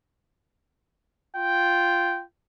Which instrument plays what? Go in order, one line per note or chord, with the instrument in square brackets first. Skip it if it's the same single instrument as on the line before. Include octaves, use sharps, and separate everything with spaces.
[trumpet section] F4 G5